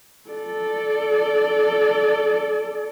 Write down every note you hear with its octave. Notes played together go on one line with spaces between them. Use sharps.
A4 D5